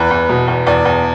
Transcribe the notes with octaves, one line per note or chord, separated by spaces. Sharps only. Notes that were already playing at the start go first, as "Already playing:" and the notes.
Already playing: E2 B4
E2
B2
E2
E2 D5
E2